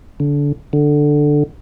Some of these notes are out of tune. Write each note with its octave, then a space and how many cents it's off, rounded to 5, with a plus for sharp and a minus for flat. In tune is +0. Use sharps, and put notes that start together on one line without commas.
D3 -25
D3 +5